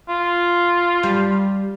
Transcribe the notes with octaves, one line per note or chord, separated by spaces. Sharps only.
F4
G3